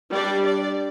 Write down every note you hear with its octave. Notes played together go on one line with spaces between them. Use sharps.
G3 D4 D5
D5